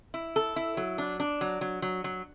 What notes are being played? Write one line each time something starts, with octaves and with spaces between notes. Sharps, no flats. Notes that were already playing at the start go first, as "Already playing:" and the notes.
E4
A4
E4
F#3
D4
D4
F#3
F#3
F#3
F#3